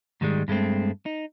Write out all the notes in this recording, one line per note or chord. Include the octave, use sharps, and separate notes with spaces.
G#2 D#3 F3 G3 G#3
G2 G#3 A3 C4
D#4